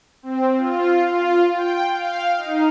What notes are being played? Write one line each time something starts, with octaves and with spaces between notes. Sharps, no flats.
C4
F4
F4
G5
F5
D#4